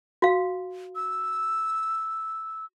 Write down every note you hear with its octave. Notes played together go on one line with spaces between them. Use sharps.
F#4 F5
E6